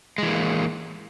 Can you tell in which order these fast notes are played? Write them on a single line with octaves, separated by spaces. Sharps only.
G#3 E3 A#3